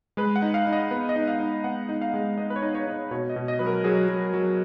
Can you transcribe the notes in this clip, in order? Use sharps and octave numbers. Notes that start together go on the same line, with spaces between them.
G#3 B4
F#5
D#4
F5
D#4
D#5
B3 B4
D#5
D#4
F5
D#4
B3 F#5
D#4
F5
G#3
B3 D#5
B4
C#5
D#4
C#5
D#4
C#5
B2 C#5
D#5
B2
D#5
F#3 B4
A#4
F#3 G#4
F#3
F#3